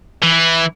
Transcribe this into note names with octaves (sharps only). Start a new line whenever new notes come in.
E3